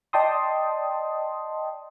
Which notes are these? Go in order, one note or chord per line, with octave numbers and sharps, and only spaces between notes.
D5 D#5 G5 A5 C6 D#6